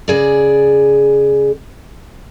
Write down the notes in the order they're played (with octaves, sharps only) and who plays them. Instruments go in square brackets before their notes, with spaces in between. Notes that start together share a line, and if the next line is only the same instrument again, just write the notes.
[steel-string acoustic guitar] C#3 G#4 D5